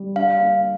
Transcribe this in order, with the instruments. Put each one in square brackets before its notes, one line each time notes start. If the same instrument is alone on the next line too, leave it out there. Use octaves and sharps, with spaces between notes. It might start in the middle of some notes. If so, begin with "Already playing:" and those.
Already playing: [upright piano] G3
[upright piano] D4 [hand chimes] F5
[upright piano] A#3